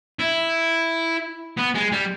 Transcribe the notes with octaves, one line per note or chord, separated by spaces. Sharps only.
E4
B3
G#3
G3